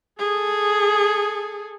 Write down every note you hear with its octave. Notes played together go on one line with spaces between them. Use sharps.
G#4 A4